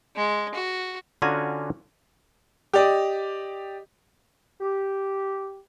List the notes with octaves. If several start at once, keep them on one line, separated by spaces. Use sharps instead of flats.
G#3
F#4
D3 C#4 F4 F#4 G#5 A#5
G4 D5 D#5
G4